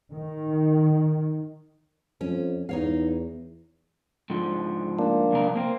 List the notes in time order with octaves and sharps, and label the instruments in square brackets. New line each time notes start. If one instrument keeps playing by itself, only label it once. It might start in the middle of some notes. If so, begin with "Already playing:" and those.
[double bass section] D#3
[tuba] F2 [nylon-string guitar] C#4
[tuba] E2 [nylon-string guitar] D#4 C#5 F5
[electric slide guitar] G#2 D3 F3
[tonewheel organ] A#3 D4
[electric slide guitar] F2 C3 A#4
A#3 C4